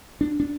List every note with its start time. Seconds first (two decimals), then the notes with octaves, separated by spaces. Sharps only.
0.21 D4
0.40 D4